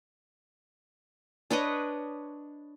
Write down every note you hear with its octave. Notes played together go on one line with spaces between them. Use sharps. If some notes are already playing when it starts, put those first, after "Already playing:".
D4 B4 C#5 D#5